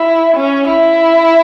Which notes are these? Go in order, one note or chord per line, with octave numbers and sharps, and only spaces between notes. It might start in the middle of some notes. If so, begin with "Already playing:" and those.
Already playing: E4
C#4
E4